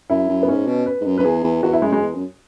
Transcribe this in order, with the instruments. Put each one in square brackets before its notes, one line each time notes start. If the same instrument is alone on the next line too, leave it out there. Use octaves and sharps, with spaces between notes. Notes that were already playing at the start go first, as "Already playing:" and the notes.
[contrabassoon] F#2 [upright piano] E4
[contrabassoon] F#2
[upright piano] B3
[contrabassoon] G#2 [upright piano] C#4
[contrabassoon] B2
[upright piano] B4
[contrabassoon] G#2
F#2
[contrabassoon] F#2 [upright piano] B4
[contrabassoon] E2 [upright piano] G#4
[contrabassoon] E2
[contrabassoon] E2 [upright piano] F#4
[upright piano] E4
[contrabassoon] F#2 [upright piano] G#3
[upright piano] G#3
[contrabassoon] E2
F#2